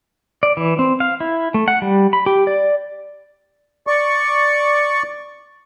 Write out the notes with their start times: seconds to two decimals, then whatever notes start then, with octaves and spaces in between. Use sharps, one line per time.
0.43 D5
0.57 E3
0.79 C4
1.00 F5
1.20 E4
1.54 A3
1.68 F#5
1.82 G3
2.13 B5
2.26 G4
2.47 D5
3.87 D5 C#6